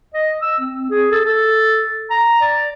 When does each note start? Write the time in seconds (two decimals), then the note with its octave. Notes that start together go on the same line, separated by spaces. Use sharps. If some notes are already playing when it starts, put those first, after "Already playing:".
0.14 D#5
0.42 E6
0.60 C4
0.91 G#4
1.12 A4
1.25 A4
2.11 A#5
2.41 D5